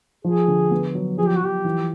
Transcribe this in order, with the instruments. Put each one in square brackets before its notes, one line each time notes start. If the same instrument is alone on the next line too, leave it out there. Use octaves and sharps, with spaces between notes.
[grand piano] F3 [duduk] G#4
[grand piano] D3
B3
F#3
[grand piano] F3 [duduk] G#4
[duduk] G4
F#4
[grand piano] F3 [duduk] G4
[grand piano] E3